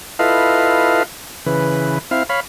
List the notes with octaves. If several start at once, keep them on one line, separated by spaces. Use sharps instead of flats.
E4 F4 A4 B4 D#5 F5
C#3 E3 B4
C4 E4 F5
C#5 F5 B5